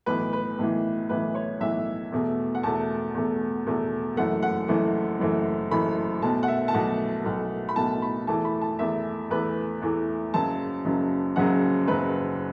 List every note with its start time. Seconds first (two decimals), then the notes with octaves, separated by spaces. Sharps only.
0.06 B1 A2 E3 B4
0.33 B4
0.59 B1 A2 E3
1.09 B1 A2 E3 B4
1.35 C#5
1.60 B1 A2 E3 E5
2.12 E2 B2 A3
2.55 F#5
2.63 E2 B2 A3 A5
3.14 E2 B2 A3
3.67 E2 B2 A3
4.17 F#1 F#2 E3 A3 F#5
4.43 F#5
4.68 F#1 F#2 E3 A3
5.19 F#1 F#2 E3 A3
5.71 F#1 F#2 E3 A3 B5
6.22 B1 B2 A3 A5
6.43 F#5
6.48 E5
6.68 A5
6.73 B1 B2 A3 F#5
7.25 B1 B2 A3
7.69 B5
7.76 B1 B2 A3 A5
8.02 B5
8.27 E2 E3 A3 A5
8.45 B5
8.61 A5
8.79 E2 E3 A3 E5
9.30 E2 E3 A3 B4
9.82 E2 E3 A3
10.34 F#1 F#2 C#3 F#3 A5
10.85 F#1 F#2 C#3 F#3
11.36 F#1 F#2 C#3 F#3 F#5
11.87 F#1 F#2 C#3 F#3 B4